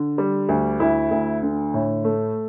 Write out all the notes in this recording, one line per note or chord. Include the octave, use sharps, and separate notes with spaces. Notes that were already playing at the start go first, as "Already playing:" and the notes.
Already playing: D3
G3
D2
D2 E4
D2
D3
A2
A3